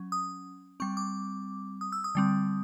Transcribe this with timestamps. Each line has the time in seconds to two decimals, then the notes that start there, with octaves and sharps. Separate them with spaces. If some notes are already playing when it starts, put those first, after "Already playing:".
Already playing: F#3 C#4
0.12 D#6
0.80 G3 C4 C#6
0.97 D6
1.81 D#6
1.92 E6
2.04 D#6
2.15 D3 G3 C4